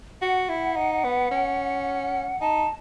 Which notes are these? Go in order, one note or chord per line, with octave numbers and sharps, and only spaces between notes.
F#4 F#5
E4
D#4
B3
C#4
D#4 A5